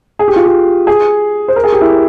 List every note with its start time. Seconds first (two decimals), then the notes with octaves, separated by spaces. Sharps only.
0.19 G#4
0.28 G4
0.36 F4
0.46 G4
0.87 G#4
1.48 C5
1.56 A#4
1.64 G#4
1.73 G4
1.81 E4